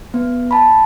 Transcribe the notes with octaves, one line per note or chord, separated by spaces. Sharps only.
B3
A5 B5